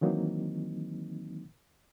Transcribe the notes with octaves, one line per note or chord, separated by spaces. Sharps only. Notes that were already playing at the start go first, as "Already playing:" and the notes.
D#3 E3 F#3 A#3 C4 D#4